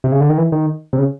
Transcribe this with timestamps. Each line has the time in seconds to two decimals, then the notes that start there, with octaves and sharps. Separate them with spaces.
0.04 C3
0.12 C#3
0.21 D3
0.29 D#3
0.38 E3
0.52 D#3
0.93 C3
0.99 C#3